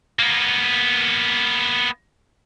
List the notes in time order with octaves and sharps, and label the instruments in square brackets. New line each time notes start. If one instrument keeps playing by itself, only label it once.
[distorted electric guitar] A#3 B3